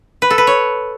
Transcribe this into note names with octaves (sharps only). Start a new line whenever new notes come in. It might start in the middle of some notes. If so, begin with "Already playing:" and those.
B4
A4
B4
C#5